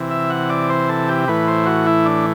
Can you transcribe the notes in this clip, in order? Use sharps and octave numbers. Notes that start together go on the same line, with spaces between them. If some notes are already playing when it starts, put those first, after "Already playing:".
Already playing: C3 E3
E5
F#5
D5
C5
A4
G4
A2 E3 B4
C5
F#4
E4
D4